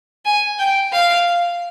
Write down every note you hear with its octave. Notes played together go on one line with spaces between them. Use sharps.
G#5
G5
F5